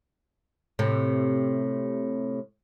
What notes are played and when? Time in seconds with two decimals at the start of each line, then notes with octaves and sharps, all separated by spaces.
0.79 A2 C3